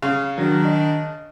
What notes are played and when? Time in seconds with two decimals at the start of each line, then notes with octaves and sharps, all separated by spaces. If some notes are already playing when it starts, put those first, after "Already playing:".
0.02 C#3 F5
0.38 D#3 F#3 D4
0.65 D#5